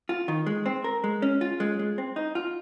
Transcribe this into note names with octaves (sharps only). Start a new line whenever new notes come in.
F4
D#3
G#3
C4
A#4
G#3
C#4
F4
G#3
G#3
C4
D#4
F4